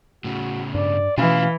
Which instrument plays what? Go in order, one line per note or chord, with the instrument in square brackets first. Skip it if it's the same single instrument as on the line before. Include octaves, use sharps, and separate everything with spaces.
[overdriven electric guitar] A2 C#3 [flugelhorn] F#4
[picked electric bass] G2 [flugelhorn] D5
[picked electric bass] B2 A3 C#4 [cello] E3 [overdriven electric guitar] E4 F4 [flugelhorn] F5